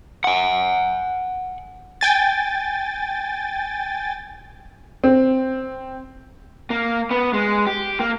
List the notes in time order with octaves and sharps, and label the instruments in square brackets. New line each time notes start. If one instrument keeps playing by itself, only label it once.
[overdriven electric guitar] F#5 G#5
[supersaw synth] G5 G#5 A6
[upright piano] C4
[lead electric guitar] A#3
B3
G#3
G4
A#3